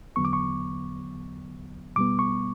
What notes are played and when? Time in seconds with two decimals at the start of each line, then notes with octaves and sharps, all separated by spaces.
0.16 E2 D3 F#3 B3 C#6
0.25 D6
0.33 C#6
1.96 B2 G3 B3 D6
2.19 C#6